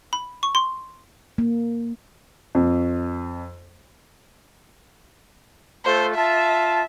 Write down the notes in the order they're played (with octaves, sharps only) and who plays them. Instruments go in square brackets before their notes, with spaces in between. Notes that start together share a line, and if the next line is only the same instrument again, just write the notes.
[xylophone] B5
C#6
C6
[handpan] A#3
[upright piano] F2
[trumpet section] A3 F4 A4 [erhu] C5
[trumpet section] F4 A5 [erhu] E5